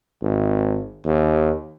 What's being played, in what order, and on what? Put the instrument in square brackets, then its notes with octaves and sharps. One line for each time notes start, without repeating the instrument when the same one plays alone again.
[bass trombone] G#1
D#2